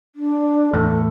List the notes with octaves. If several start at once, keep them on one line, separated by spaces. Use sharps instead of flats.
D4
E2 A2 A4